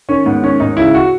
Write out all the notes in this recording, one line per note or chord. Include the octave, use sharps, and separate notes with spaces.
D#3 C#4
G#2 B3
D#3 C#4
G#2 D#4
C#3 E4
F#4